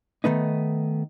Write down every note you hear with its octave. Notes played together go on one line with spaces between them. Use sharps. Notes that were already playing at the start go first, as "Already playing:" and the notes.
D#3 A3 B3 D#4